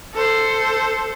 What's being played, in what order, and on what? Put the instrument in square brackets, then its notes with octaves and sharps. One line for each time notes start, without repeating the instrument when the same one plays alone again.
[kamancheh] A4 C5